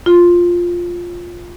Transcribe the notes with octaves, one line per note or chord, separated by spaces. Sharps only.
F4